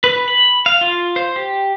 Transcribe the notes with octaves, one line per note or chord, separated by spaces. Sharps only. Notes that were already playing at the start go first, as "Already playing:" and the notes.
B4
B5
F5
F4
C5
G4